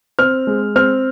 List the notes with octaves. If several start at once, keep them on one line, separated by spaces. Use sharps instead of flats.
C4 F6
G#3
C4 F6